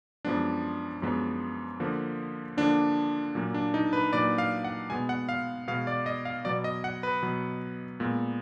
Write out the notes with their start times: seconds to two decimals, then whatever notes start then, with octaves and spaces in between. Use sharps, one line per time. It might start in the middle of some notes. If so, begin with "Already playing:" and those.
0.25 F#2 F3 G#3 B3 D4
1.02 F#2 F3 G#3 B3
1.80 D3 F3 A#3
2.57 D3 F3 A#3 D4
3.35 A#2 F#3 A#3
3.54 D4
3.74 D#4
3.93 B4
4.13 A#2 F#3 A#3 D5
4.38 F5
4.64 F#5
4.90 B2 G#3 B3 G#5
5.09 F#5
5.29 F5
5.68 B2 G#3 B3 F5
5.87 D5
6.06 D#5
6.25 F5
6.45 B2 F#3 B3 D5
6.64 D#5
6.84 F#5
7.03 B4
7.22 B2 F#3 B3
8.00 A#2 G#3 B3